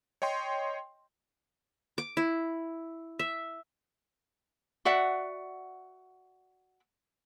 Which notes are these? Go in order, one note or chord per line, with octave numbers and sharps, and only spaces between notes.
C#5 D#5 G5 C6
D6
E4
E5
F#4 D5 E5 F#5